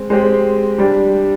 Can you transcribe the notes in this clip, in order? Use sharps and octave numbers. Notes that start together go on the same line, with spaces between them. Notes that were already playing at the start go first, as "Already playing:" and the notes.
Already playing: G#3 C4
G#3 C4 G4
G3 D4 G4